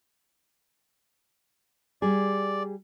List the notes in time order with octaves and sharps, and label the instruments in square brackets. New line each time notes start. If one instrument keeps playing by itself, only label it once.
[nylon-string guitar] G3 G#4 [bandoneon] D5